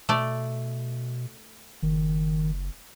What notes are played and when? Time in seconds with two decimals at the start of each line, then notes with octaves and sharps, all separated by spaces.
0.09 B2 A3 D5
1.83 F#1 D#3